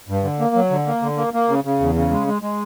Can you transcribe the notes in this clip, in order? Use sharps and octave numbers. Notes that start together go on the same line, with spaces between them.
G2
D3
A#3
F#3
D3
A#3
D3
A#3
A#3
C#3
C#3
E2
C#3
G#3
G#3
G#3